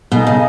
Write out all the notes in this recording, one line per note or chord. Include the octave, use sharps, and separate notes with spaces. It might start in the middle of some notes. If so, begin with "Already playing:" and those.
B2 D#4 A4 D#5 G#5
C#3